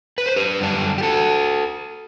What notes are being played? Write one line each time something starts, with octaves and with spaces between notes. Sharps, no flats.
B4
C5
G4 B4
F#2 D3 G3 D4
G4
F#4 A4